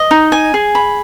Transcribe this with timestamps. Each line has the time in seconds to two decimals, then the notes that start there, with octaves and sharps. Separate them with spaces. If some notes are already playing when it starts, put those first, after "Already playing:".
Already playing: D#5
0.11 D#4
0.32 G#5
0.54 G#4
0.75 B5